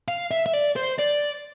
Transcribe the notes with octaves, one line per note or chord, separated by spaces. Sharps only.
F5
E5
E5
D5
C5
D5